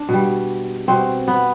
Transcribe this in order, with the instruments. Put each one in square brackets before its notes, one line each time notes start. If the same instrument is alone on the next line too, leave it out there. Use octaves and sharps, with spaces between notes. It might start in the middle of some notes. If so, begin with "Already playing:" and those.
Already playing: [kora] D4
B2 G3
B2 G3 C4
B3